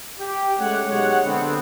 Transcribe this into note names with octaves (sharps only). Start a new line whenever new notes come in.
G4
G#3 A3 C#4 G4 C#5 F#5
B1 G#3 G4 C#5 F#5
D3 B3 C4